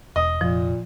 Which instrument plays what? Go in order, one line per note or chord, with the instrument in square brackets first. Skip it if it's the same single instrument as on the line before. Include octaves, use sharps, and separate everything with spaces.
[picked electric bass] E1 [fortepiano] D#5
[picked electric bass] F1 [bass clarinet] A#2 [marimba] F3